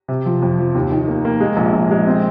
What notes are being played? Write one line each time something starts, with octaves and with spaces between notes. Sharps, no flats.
C3
F3
F2
F3
D#2
D#3
A#3
A#3
G#3
A#1
A#1
G#3
C4